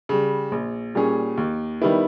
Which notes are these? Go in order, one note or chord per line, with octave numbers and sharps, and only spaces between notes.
C#3 G3
A#1
A#2 G3 C#4 G#4
D#2
D#3 G3 B3 E4